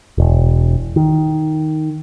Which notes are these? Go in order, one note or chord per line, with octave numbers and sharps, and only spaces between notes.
E1
D#3